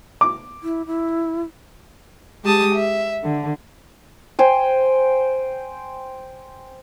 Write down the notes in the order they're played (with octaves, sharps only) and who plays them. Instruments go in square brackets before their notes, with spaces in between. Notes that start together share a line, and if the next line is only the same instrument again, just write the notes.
[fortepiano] D6
[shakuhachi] E4
E4
[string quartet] G#3 G4 A5 D#6
E5
D3
[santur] C5 G5 G#5